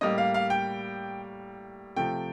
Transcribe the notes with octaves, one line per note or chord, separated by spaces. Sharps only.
A2 G3 A#3 D#5
F5
F5
G5
C3 F3 A3 G5